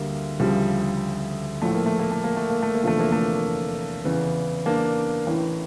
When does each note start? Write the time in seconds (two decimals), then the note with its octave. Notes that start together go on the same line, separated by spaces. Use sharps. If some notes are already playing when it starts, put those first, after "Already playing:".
Already playing: D2 D3 G3 A#3
0.40 D2 C#3 F3 G3
1.62 A#1 A2 F3 A3
1.74 A#3
1.86 A3
1.99 A#3
2.12 A3
2.24 A#3
2.37 A3
2.50 A#3
2.62 A3
2.75 A#3
2.84 F1 E2 D3 F3 A3
3.00 A#3
3.12 A3
4.05 E2 C#3 E3
4.66 A#3 D4
5.27 A1 A2 E3